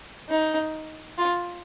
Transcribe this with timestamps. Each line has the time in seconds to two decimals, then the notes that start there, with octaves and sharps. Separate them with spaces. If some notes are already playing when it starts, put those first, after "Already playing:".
0.29 D#4
1.18 F4